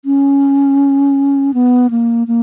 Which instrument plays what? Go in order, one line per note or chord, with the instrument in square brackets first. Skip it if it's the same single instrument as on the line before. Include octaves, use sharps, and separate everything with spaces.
[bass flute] C#4
B3
A#3
A#3